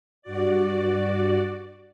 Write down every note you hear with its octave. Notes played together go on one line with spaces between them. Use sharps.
G2 F#4 D5